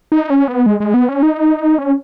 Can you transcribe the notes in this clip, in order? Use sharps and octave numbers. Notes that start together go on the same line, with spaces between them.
D#4
C#4
B3
G#3
G#3
B3
C#4
D#4
C#4